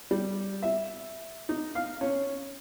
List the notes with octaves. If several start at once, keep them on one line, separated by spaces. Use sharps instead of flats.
G3
E5
D#4
F5
C#4